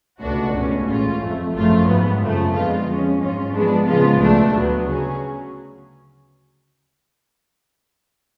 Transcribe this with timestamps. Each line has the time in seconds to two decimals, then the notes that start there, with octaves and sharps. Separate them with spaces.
0.20 C#2 B2 A3 D4 F#4
0.52 C#2 B2 A3 C#4
0.87 A1 A2 G#3 C#4 F4
1.20 F2 F3 A3
1.53 G#1 F#2 F3 A3 F4
1.86 G#2 F#3 B3
2.20 F#2 C#3 F3 A3
2.53 F2 D3 G#3 B3 F4
2.86 F3 G#3 C#4
3.20 G#2 F#3 C#4 F4
3.54 F3 G#3 B3 D4
3.87 C#3 F3 G#3 B3 F4
4.20 C#2 B2 A3 D4
4.53 D2 D3 F#3 B3
4.87 C#3 F#3 C#4 G#4